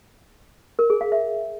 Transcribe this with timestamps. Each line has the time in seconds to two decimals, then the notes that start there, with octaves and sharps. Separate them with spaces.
0.79 A#4
0.90 G#4
1.01 F5
1.12 E5